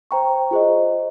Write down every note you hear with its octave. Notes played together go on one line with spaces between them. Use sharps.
C5 G5 A#5 C#6
F4 G#4 C5 D#5